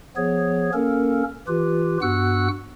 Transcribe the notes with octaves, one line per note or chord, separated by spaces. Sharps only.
F3 B3 G#4 C#5
A#3 C#4 A4 A#4
E3 F4 G4 B4
G2 B3 F#4 F#5 E6 F#6